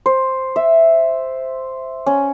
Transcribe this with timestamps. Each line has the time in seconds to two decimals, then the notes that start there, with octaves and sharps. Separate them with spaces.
0.06 C5
0.56 E5
2.06 C#4